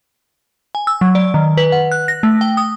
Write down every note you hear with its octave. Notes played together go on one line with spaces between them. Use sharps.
G#5
E6
F#3
D5
D#3
B4
F#5
F#6
A#6
A3
G5
D#6